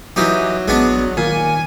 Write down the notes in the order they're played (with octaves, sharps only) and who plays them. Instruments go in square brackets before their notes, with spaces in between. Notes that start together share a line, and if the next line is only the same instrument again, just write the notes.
[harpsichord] E3 D#4 G4 [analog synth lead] F#3
[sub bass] A1 [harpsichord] G#3 B3 D4
[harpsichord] A#2 [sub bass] D#3 [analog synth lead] G#5